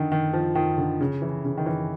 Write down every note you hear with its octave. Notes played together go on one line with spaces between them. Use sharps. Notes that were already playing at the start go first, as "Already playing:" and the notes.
Already playing: D3 D#3
D#3
F3
D#3
D3
C#3
E3
C#3
D#3
E3